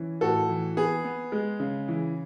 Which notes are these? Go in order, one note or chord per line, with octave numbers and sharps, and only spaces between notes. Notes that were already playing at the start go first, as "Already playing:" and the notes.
Already playing: E3 C#4
A2 F#4 A4
E3
B3 G#4
B3
G#3
C#3
E3